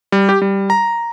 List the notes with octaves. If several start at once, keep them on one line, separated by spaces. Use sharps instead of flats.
G3
G4
G3
A#5